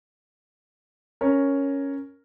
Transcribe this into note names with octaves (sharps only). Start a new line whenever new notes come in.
C#4 A#4